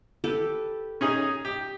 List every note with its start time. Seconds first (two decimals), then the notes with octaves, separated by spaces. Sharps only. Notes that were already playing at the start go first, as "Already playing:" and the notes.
0.24 G4 A4 B4
1.01 C#4 D#4 G#4
1.45 G4